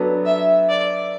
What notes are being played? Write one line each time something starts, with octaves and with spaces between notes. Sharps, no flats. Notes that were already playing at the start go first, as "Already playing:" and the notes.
Already playing: F#3 B3 D4 A4
E5
D5